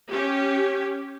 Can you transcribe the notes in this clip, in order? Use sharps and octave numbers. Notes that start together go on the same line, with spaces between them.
C#4 G4